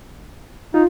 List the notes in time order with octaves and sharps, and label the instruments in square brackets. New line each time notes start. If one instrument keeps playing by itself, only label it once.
[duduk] D#4 [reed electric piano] F4